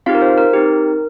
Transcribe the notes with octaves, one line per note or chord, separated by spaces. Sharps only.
C4 D#4 F4 G4 F5
A#4
C5
A#4
C4 D#4 G4